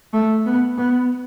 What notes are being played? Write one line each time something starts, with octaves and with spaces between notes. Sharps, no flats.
A3
B3
B3